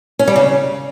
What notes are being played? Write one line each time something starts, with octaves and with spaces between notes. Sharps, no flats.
C#4
G3
C#3